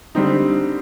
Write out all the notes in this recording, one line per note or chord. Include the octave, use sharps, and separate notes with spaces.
D3 G3 C4 D#4